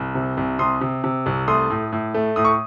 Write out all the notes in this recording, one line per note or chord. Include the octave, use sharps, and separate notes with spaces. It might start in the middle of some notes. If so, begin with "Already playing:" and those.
Already playing: C2
C3
C2
C3 C6 D#6
C3
C3
C2
A3 C6 D#6
A2
A2
A3
A2 D#6
C#6